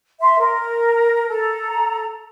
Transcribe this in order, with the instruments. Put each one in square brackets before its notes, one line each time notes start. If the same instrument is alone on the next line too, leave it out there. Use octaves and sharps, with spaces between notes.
[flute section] E5 C6
A#4
A4 A#5